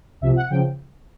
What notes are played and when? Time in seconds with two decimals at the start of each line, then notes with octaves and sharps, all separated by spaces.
0.21 C2 C3 F3 E5
0.36 F#5
0.50 C#3 F3 G5